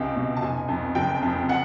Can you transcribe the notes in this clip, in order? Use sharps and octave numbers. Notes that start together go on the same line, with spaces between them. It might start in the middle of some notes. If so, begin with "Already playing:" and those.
Already playing: C#2 C3 G5
B2
A5
F1 G#5
F2
F#1 G5
F2
F#5